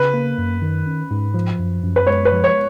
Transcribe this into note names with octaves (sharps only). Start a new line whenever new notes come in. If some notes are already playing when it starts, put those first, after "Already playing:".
Already playing: C#3 B4
A#3
F#2
D#3
C#4
G#2
F3
F#2
F#2
B4
G#3 C#5
B4
F3
C#5